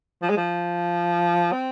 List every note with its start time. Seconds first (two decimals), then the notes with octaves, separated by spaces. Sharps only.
0.22 F3
0.30 G#3
0.37 F3
1.52 C4